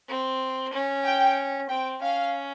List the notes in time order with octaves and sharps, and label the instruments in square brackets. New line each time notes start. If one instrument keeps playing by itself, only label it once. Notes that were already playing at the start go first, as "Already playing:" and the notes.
[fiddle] C4
C#4
[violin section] G5
[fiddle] C4 [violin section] G5
[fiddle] C#4 [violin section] F5